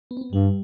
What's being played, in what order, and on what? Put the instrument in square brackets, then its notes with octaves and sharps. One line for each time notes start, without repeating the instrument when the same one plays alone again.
[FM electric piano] B3
C4
B3
[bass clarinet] G2 [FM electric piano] G3